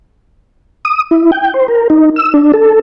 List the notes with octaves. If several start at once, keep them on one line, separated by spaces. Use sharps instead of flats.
D#6
E4
G5
C5
A#4
D#4
E6
D4
A4